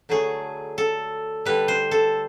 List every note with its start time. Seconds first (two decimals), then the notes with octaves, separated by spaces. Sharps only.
0.09 D3 F#3 A3 G#4
0.78 A4
1.46 D3 G3 B4
1.68 C5
1.91 A4